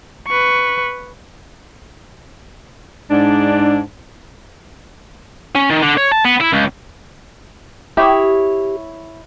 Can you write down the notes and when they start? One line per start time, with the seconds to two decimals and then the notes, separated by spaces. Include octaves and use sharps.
0.28 B4 C#6
3.11 G#2 D4
5.55 C#4
5.70 D#3
5.82 D3
5.97 C#5
6.12 A5
6.25 B3
6.41 E4
6.53 C#2
7.97 E4 G4 C#5 D#6